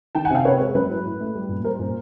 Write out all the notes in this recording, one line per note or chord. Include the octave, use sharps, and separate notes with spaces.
D#3 G5 A5
F#5 G#5
C3 F5 G5
C3 B4 C#5
G#3 B4
F#3 B4
A2
A2
A3
G3
A#2
G3 A#4 C5
A#2